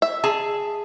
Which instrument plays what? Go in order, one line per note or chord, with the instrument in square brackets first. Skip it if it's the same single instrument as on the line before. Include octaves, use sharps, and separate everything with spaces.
[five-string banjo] E5
[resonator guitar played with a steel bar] G#4 A5